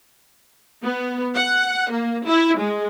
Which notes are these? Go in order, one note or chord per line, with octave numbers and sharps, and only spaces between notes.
B3
F#5
A#3
E4
G#3